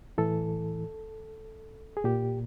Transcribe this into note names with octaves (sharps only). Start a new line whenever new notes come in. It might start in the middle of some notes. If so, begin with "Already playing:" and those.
A2 E3 A4
G#4
A#2 G4